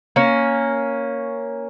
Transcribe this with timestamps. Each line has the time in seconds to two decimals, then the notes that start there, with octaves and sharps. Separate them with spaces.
0.16 A#3 C#4